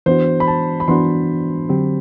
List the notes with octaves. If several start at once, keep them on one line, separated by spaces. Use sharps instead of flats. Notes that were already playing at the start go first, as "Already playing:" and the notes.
E3 B3 D4 F#4 C5
B5
A5
B5
E3 B3 D4 F#4 C6
D3 F#3 C4 G4